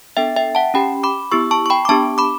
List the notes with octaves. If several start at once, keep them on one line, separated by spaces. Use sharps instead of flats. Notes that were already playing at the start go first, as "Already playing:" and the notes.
B3 D4 A4 E5 G5
E5 G5
F#5 A5
C#4 G4 G5 B5
B5 D6
B3 E4 G4 C#6 E6
A5 C#6
C#6
G5 B5
D6
B3 D4 G4 A5 C#6
B5 D6